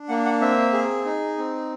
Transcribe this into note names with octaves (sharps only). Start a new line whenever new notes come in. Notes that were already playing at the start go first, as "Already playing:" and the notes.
Already playing: D4
A#3 F#5
F#5
C4 E5
G#4
D#4
C4